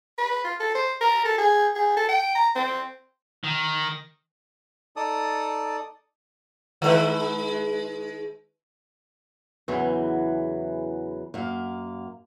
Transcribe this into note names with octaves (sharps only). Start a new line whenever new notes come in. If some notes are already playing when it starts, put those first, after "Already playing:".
B4
F4
A4
C5
A#4
A4
G#4
G#4
A4
G5
A#5
C4
D#3
D#4 A4 D5 A5 D#6
D#3 G#3 B4
E2 C#3 E3 F#3
F#2 A#3